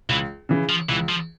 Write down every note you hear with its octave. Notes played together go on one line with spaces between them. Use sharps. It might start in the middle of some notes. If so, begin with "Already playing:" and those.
C#2 E3
C#3 E3
F3
C#2 E3
F3